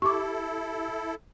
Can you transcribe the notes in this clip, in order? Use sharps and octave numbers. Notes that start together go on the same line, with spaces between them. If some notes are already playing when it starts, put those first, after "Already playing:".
E4 G4 A4 C#6 D6